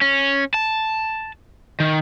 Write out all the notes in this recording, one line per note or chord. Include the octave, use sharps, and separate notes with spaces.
C#4
A5
D#3